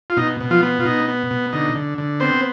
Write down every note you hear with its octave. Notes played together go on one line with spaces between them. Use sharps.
F4
B2 D#4
B2
F3 F4
B3
F4
B2 D#4
B3
B2
D3 D#4
D3
D3
B3 C4 C5